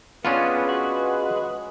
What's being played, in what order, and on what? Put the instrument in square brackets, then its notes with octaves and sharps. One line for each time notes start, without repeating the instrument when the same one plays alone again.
[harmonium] G#3 G#4 B4 [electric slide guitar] B3 [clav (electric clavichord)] C#4 D4 F4
[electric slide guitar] F#4